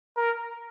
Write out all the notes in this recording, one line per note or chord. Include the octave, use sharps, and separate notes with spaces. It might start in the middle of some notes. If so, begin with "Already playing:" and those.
A#4